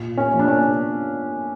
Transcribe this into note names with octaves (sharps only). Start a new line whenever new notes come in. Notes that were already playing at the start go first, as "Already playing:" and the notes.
Already playing: A#2
C#4
F3 A#3
D4
C#4